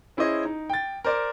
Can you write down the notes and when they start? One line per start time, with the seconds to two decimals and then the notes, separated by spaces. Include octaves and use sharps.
0.17 C#4 E4 G#4 C5 D#5
0.45 D#4
0.70 G5 A6
1.05 A#4 C5 D5